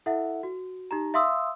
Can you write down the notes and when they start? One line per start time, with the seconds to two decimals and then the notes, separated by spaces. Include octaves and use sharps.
0.06 E4 A4 E5 F#5
0.43 F#4
0.91 D#4 G4 A#5
1.14 E5 F5 C6 D#6 E6